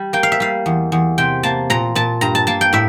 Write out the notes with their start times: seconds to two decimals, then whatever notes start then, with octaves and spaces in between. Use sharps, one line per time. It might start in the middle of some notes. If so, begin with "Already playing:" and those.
Already playing: G3
0.13 A#3 G5
0.23 F5
0.32 E5
0.40 G3 F5
0.66 E2
0.92 E2
1.18 C3 G5
1.43 A#3 A5
1.70 A#2 A#5
1.95 A#2 A5
2.21 G2 A#5
2.35 A5
2.47 A#3 A5
2.61 G5
2.73 A2 E5